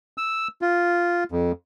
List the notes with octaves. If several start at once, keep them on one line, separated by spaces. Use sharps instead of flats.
E6
F4
F2